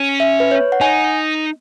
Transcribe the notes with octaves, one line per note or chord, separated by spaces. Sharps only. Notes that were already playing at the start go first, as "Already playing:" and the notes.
Already playing: C#4
E5
B4
C#5
F#5
D#4 G#5